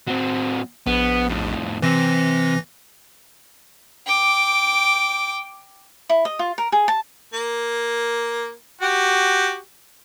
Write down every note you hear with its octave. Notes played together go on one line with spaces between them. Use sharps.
F#3 C4
A#1 B3
F2 A2
C3 E3 C4 A#6
G5 D6
E4
D#5
F4
A#4
G#4
A5
A#3
F#4 G4